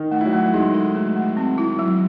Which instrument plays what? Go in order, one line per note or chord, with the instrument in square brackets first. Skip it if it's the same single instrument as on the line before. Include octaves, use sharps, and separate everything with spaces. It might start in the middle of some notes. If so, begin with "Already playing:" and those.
Already playing: [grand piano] D#3 D#4
[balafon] A3
[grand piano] E4
F#3 F#4
[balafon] A3
[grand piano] G#3 [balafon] D#4
[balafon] A4
A3
A3
C4
E4
F#3